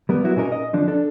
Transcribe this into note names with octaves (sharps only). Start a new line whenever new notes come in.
G3 B3 A#4
F#3 B3 E4 F#4
A#2 C#4 D#4 A#4
D#5
D3 F3 D4
D4 A4